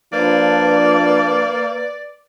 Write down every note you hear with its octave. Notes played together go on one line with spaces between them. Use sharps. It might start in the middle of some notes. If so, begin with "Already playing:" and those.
F3 A#3 D4 B4 D5